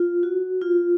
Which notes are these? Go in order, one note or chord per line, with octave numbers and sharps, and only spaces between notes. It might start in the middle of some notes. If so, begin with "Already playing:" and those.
Already playing: F4
F#4
F4